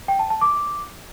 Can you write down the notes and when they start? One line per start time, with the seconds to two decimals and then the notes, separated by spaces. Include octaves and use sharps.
0.08 G5
0.19 A5
0.30 A5
0.41 D6